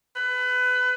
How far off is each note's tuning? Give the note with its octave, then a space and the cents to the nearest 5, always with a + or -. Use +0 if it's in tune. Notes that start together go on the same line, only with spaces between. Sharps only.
B4 +25